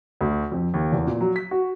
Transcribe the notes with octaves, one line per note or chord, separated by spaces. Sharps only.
D2
F2
D#2
E2
A#2
F#3
B6
F#4